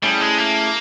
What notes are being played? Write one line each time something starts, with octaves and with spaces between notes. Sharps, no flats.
G3 A3 C#4 E4 G#4
G#3
A#3